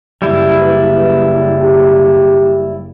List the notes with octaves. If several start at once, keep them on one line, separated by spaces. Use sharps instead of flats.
F#1 G3 E4
B4
G4